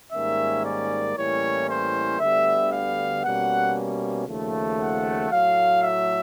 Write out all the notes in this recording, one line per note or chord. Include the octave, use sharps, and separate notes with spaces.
G#2 D#3 G3 A#3 C#4 E5
D5
A2 E3 G3 A#3 C#4 C#5
C5
D2 D3 G3 B3 E5
F5
B2 G3 A#3 C#4 F#5
D#2 C#3 F3 A3
F#5
A2 F#3 A3 F5
E5